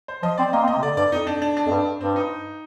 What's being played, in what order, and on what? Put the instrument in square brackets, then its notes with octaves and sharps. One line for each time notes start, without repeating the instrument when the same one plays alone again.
[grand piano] C5
[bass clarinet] F3 [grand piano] D#5
[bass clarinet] C4 [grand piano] D5
[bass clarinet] A#3 [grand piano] D#5
[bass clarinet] C4
[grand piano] D#5
[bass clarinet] A#3
C3
[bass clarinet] D3 [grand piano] D5
[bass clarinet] G2 [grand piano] D5
[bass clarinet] F2 [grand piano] D#4
[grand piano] D4
D4
D4
[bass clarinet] F2
G2
[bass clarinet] G2 [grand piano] C4
[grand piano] D#4